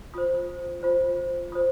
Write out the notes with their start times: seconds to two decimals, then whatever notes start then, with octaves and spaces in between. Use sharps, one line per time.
0.14 F4 C5 D#6
0.83 F4 C5
1.52 F4 C5 D#6